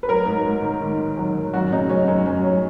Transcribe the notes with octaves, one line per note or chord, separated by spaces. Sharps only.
B4
F#3 A#4
G#2
G#2
D#3
G#2
D#3
F#3
D#3
F#2 F#4
C#3 D#4
F#2 C#4
F#2
F#2 C#4
F#2